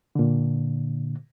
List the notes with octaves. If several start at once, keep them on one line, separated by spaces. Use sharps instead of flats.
A#2 D3